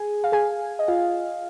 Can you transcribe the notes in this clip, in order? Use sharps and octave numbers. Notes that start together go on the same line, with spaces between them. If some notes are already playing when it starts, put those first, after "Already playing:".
Already playing: G#4 G#5
F5
G#4 G#5
D#5
F4 F5